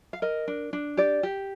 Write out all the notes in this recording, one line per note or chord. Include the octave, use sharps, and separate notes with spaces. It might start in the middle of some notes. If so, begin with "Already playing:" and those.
F5
A#4 D#5
D4
D4
G4 D5
G4